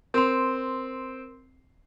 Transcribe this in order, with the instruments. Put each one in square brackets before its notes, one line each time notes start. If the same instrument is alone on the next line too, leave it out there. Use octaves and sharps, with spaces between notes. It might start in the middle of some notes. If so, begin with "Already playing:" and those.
[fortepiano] C4 [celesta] A#4 C6